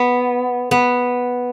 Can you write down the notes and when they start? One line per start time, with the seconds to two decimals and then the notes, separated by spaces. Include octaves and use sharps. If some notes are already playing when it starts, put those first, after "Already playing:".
Already playing: B3
0.71 B3